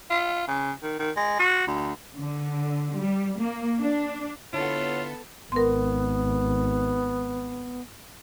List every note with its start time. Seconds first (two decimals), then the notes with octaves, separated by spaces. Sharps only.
0.10 F4
0.48 C#3
0.83 D#3
0.99 D#3
1.16 G#3
1.39 F#4
1.67 D2
2.17 D3
2.94 G3
3.39 A#3
3.79 D4
4.53 D3 B3 D4 E4 F4 A4 C#5
5.52 G#1 B3 A#4 C6